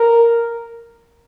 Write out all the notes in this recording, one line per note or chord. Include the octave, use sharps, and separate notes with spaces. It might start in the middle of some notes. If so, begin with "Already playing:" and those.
Already playing: A#4